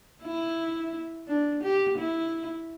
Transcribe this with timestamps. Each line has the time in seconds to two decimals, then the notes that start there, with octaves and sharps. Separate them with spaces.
0.23 E4
1.28 D4
1.63 G4
1.98 E4